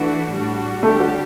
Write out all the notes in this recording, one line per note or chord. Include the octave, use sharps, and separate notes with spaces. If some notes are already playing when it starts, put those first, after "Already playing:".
Already playing: E3 A3 D4 F#4
A2 G3 D4 F#4
D3 G3 A3 D4 G4
F#4